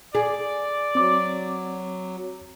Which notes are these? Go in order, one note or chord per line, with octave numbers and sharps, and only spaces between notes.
G#4 D5
F#3 C4 D6